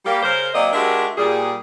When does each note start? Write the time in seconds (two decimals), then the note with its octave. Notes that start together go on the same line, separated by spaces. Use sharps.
0.05 G3 A#3 G4
0.23 C#3 A#4 C5
0.54 F#3 A#3 C4 D5 D#5
0.73 G#3 D4 F#4 G4 A#4 E5
1.17 A#2 G3 G#4